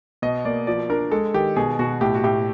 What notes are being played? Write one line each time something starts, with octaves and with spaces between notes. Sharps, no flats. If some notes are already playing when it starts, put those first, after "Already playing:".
B2 D#5
A#3 D5
F3 D5
D4 A#4
G#3 A4
D#3 G4
B2 G#4
B2 F#4
A2 G4
F#4
A2 G4